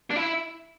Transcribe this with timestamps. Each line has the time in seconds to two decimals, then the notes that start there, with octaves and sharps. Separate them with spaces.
0.10 D4
0.16 E4